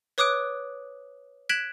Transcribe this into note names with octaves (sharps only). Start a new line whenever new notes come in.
B4 C#5 D6 D#6 F#6 D7
F#6 G#6 B6 D7 E7 F#7